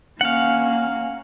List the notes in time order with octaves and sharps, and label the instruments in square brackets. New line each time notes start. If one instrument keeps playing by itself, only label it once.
[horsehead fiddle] A#3 C#4 [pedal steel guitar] F5 F#5